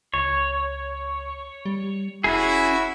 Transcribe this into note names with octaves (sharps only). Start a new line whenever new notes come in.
C#2 C#5
G3
E1 C#4 E4 F#4 G#4